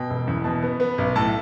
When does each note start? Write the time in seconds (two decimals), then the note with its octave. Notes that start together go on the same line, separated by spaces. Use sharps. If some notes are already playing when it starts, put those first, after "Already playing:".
Already playing: B2 G5
0.10 E1
0.27 E2
0.44 B2 A5
0.63 B3
0.80 B3
0.98 B1
1.16 A2 A5